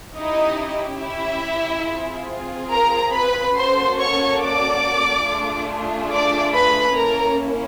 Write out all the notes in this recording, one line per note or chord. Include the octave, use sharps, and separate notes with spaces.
C#4 D#4 E4 G4 D#5
E4 E5
C4 F4 G#4
A#4 A#5
B4 B5
A#3 C#4 F#4 A4 C5 C6
C#5 C#6
D5 D6
A3 D4 F4 G#4
D5 D6
B4 B5
A#3 C#4 E4 A4 A#4 A#5